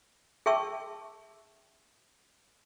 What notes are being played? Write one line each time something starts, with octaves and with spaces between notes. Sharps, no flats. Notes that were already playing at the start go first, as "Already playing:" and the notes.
G#4 E5 G5 A5 C#6 E6